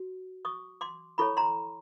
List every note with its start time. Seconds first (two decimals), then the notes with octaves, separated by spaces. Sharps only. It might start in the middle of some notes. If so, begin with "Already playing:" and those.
Already playing: F#4
0.45 C#6 D#6
0.81 C6 D6
1.18 E4 A4 C#5 B5 C#6
1.37 A#5 C6